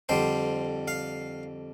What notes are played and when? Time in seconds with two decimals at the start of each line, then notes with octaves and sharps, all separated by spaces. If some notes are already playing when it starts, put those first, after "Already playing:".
0.09 F2 D3 G3 C5
0.88 F5